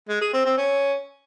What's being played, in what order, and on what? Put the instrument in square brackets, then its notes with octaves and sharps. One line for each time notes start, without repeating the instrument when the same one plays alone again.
[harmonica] G#3
G#4
C4
C4
C#4